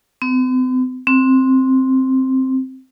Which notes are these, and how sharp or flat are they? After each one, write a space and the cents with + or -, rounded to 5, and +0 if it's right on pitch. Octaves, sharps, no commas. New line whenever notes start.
C4 -45
C4 +5